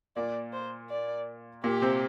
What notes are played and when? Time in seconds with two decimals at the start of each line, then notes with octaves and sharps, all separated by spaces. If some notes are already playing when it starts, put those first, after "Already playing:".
0.16 A#2 A#3 D5
0.53 C5
0.90 D5
1.63 A#2 A#3 G4
1.82 C3 C4